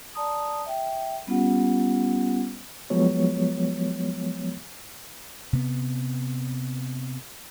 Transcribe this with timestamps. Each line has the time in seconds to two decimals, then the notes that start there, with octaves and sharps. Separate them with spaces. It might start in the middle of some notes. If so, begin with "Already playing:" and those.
0.15 D5 A5 A#5 D#6
0.66 E5 G5
1.27 G3 B3 C#4 F4 G4 F#5
2.90 F3 F#3 G#3 B3 C#5
5.53 C3 B3